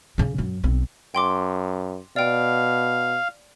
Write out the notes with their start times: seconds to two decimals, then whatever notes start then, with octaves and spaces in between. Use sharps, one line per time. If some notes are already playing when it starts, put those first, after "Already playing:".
0.18 C#3 C#4
0.38 F#2
0.64 B1 C4
1.15 F#2 G5 C6 D6
2.16 B2 D5 F5 G5